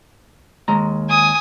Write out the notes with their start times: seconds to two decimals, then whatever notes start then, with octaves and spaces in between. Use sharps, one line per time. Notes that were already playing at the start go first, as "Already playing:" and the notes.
0.68 D#2 G#3 A#5
1.10 G#5 D#6